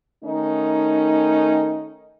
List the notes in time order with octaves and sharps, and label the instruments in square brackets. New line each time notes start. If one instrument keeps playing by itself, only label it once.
[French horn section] D#3 A3 C#4 D#4